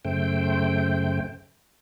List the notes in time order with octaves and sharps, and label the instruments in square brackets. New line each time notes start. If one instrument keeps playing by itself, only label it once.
[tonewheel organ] F#2 C#3 A3 C5 G5